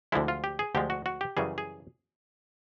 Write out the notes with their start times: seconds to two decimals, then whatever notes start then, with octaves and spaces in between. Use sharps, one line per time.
0.12 D2 D3 F3 G#3 E4
0.28 F4
0.44 G4
0.59 G#4
0.75 D2 D3 F3 G#3 G4
0.90 F#4
1.06 F#4
1.21 G4
1.37 F#2 C#3 E3 G3 G#4
1.58 G#4